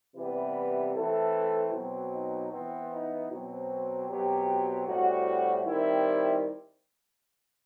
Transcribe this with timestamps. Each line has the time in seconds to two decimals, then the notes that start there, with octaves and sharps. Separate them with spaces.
0.16 C3 E3 G3 B3 B4
0.95 E3 A3 C4 A4
1.74 B2 F#3 C4
2.13 D#4
2.52 E3 B3 C4
2.92 D#4
3.31 B2 F#3 C4
4.09 B2 F#3 C4 G4
4.87 A2 G3 C4 F#4
5.66 D#3 G3 C4 E4